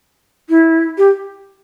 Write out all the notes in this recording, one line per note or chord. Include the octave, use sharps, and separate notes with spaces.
E4
G4